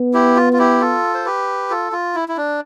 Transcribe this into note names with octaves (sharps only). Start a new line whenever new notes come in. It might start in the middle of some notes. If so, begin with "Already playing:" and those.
Already playing: B3
E4 G4
F4
F4
E4 G4
F4 A4
C5
G4 B4
F4 A4
F4
E4
E4
D4